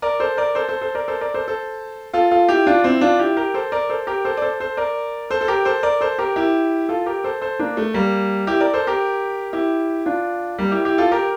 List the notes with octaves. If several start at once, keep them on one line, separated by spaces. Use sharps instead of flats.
A#4 D5
A4 C5
A#4 D5
A4 C5
A4 C5
A4 C5
A#4 D5
A4 C5
A#4 D5
A4 C5
A4 C5
F4 A4
F4 A4
E4 G4
D4 F4
C4 E4
D4 F4
E4 G4
G4 A#4
A4 C5
A#4 D5
A4 C5
G4 A#4
A4 C5
D5
A4 C5
A4 C5
A#4 D5
A4 C5
A4
G4 A#4
A4 C5
A#4 D5
A4 C5
G4 A#4
E4 G4
F4 A4
G4 A#4
A4 C5
A4 C5
A#3 D4
A3
G3 A#3
E4 G4
A#4 D5
A4 C5
G4 A#4
E4 G4
D4 F4
G3 A#3
E4 G4
E4 G4
F4 A4
G4 A#4